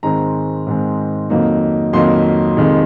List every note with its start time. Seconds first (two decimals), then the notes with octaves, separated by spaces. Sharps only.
0.03 G#2 D#3 G#3 C4 A#5
0.66 G#2 D#3 G#3 C4
1.30 F2 D#3 F#3 A#3 D#4
1.93 F2 D#3 F#3 A#3 D#4 C6
2.57 F2 C3 D#3 G#3 D#4